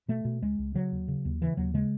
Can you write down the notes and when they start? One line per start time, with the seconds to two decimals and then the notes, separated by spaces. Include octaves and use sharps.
0.08 B2 A3
0.25 B2
0.42 C#2 G#3
0.59 C#2
0.74 C#3 F#3
0.92 D#2
1.08 C#3
1.25 D#2
1.41 C#3 E3
1.57 D#2 F#3
1.74 C#3 G#3